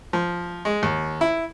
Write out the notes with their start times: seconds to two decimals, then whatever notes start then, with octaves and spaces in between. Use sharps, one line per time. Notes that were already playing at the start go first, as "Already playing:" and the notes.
0.13 F3
0.65 G#3
0.83 D#2
1.21 E4